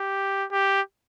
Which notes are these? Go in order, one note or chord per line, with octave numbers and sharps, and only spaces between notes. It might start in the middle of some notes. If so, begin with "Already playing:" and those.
Already playing: G4
G4